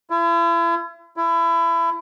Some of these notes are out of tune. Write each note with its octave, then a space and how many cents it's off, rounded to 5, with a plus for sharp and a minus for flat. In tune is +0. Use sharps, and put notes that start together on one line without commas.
E4 +40
E4 +25